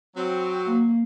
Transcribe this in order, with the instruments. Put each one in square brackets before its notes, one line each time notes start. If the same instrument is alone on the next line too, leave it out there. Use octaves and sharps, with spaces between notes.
[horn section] F#3 C4
[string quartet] A#3